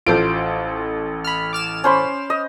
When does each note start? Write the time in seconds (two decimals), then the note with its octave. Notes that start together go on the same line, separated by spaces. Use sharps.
0.07 A1 F4 A4 C5 D7
1.24 B5 F6
1.53 D6 F6 E7
1.84 C#4 C5 B5
2.30 D#5